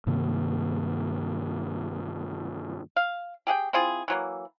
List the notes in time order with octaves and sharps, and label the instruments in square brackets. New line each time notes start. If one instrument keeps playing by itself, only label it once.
[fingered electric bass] G2 C3 D#3 A#3
[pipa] F5
G4 G#4 F#5 G5
C4 E4 F4 G#4
E3 F#3 A#3